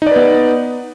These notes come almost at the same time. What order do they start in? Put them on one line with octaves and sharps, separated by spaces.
D#4 D5 B4 B3